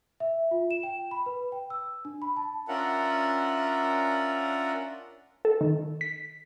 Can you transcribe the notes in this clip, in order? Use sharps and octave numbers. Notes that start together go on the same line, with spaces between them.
E5
F4
E7
G5
B5
B4
G5
E6
D4
B5
A5
C#4 D4 F4 A#4 E5 F#5
A4
D#3
B6